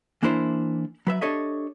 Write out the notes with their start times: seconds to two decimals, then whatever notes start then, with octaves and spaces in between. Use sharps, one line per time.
0.23 E3 A#3 D4 E4 A#4 C5
1.07 F#3 B4 E5
1.21 D4 G4 A4 C#5 D#5 E5